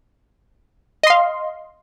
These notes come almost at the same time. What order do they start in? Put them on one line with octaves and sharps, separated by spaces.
D#5 C6 F5